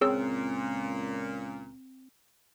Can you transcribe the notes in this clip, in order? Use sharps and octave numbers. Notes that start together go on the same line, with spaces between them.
C#2 A#2 C4 G#4 C#5 E6